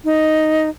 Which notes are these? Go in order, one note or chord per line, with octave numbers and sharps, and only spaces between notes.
D#4